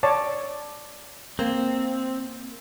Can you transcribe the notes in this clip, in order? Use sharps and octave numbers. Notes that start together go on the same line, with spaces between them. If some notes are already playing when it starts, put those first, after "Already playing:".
C#5 D5 A5
A#3 C4